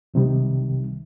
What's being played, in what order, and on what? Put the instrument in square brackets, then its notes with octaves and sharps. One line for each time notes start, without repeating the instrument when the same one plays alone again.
[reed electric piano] C2 C3 D#3 G3